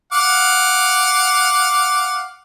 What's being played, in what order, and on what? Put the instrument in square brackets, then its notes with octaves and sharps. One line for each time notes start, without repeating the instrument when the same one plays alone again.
[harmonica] F5 F#5 D6